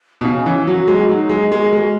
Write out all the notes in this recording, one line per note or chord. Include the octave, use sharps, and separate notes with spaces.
B2
C#3 C#4
E3
F#3 F#4 A#4
G#3
F#3 D#4
G#3
G#3 F#4 A#4
G#3